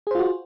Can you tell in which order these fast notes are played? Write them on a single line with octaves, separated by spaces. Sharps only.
G#4 C5 F4 F#4